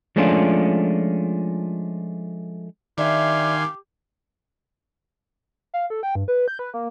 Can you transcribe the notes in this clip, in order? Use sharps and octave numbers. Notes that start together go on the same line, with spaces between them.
F3 G#3 A3 C#4 D4 F4
D#3 D4 G4 E5 F5 G#5 C6
F5
A4
G5
G2
B4
G6
B4
A#3